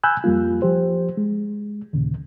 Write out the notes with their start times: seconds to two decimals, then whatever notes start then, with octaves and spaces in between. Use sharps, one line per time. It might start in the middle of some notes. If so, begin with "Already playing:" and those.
0.04 G#5 B5 E6 F#6 G6
0.24 F2 G3 A#3 F4
0.62 F3 G4 C5
1.17 G#3
1.93 D#2 A#2 C#3